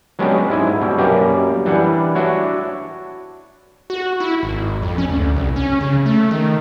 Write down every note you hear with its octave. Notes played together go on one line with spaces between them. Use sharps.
F#3 G#3 B3 C#4 D4 G4
G#2 E4 G#5
B2 G3
F#2 G3 A#3 G4 B4 A#5
E3 G3 D4 F#5
D4 E4 F#4 C#5
F#4
E4
G#1
F2
C#4
D2
C2
C#4
C#3
A3
D#3